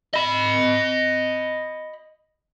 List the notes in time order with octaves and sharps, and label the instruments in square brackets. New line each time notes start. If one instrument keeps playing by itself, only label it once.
[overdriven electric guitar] D#5 B5